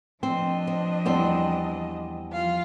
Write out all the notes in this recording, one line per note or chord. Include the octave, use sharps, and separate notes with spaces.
F3 C4 D4 D#5
C4
E2 G3 C4
F3 F4 F5